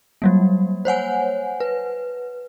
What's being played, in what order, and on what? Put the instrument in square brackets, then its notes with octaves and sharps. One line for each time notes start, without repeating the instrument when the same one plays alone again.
[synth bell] F#3 G3 A#3
C5 C#5 F#5 G#5
B4